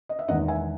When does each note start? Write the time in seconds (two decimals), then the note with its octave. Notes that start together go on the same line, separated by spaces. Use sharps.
0.09 D#5
0.19 E5
0.28 E1 E2 D#3 D#5 F#5
0.48 E5 G#5